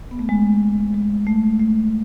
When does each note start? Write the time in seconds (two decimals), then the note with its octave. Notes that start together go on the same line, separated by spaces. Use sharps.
0.11 B3
0.19 A3
0.29 G#3
0.94 G#3
1.27 A3
1.60 A3